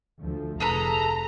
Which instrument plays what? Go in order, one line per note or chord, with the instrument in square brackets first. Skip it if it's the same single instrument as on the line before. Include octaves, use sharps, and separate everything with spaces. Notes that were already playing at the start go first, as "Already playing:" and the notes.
[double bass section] D2 F3 A3
[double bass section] F1 [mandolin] G#4 A4 B4 [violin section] A#5